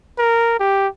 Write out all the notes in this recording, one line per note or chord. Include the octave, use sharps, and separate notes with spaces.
A#4
G4